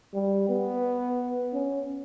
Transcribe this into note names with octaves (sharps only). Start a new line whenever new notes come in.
G3
B3
C#4